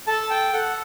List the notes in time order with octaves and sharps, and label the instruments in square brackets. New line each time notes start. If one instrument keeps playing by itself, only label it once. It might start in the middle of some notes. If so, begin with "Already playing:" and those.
[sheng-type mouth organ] A4 A5
G5
A4 F#5